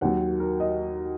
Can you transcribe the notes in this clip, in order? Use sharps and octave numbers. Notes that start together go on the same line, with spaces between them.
D#2 D#3 F#3 F#5
A#4
D#5